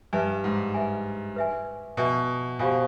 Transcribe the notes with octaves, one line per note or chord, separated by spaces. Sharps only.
G2 B4 E5 G#5
G#2
B4 E5 G#5
B4 E5 G#5
B2 B4 E5 G#5
B2 G4 C5 F5 G#5 B5